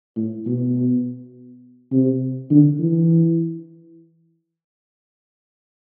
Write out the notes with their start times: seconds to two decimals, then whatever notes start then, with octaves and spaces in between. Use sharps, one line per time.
0.16 A2
0.46 B2
1.92 C3
2.51 D3
2.80 E3